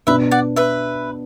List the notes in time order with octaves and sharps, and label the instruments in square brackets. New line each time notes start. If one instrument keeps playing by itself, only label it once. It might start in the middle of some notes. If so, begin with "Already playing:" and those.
[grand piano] B2 B3 D4 [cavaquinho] B4 E5
[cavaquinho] D5 F#5
B4 E5